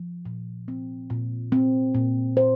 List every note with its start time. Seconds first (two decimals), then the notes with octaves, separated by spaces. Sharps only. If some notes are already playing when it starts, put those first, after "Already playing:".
Already playing: F3
0.26 A#2
0.68 C4
1.10 A#2
1.52 C4
1.95 A#2
2.37 C5